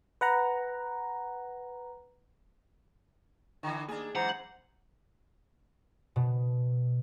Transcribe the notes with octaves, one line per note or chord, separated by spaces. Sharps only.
B4 F#5 A#5
D3 E3
D#2 D4 G#4
F#2 E3 G#3 C5 F#5 A#5
B2